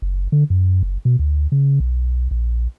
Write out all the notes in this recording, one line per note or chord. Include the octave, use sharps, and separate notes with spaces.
F#1
D3
F#2
F#1
B2
D2
C#3
B1
A#1